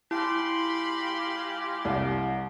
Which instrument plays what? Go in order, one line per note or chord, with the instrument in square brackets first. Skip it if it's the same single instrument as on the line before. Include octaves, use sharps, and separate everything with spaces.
[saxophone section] G#3 F4 G4 [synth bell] E4 [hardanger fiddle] B5 C6
[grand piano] C2